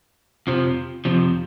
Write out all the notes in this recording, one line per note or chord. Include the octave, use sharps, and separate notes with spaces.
F2 C3 F3
F2 C3 F3